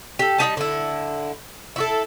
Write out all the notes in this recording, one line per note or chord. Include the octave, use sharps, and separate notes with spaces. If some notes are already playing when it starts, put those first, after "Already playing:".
G4 A4
G3 D#4 G4 A5
D3 E4
E4 F#4 A4